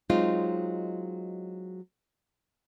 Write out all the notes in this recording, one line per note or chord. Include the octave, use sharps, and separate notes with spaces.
F#3 G#3 C4 D#4 F4